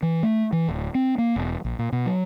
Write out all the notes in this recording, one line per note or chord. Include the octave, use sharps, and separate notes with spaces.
E3
A3
E3
D1
C4
A#3
E1
A#1
A#2
B2
F#3